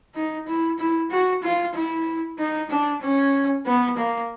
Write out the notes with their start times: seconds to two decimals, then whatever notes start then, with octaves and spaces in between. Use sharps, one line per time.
0.15 D#4
0.47 E4
0.78 E4
1.10 F#4
1.42 F4
1.74 E4
2.38 D#4
2.70 D4
3.01 C#4
3.66 B3
3.97 A#3